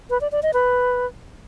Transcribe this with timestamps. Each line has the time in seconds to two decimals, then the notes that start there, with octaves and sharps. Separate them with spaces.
0.10 B4
0.21 D5
0.32 D5
0.43 D#5
0.54 B4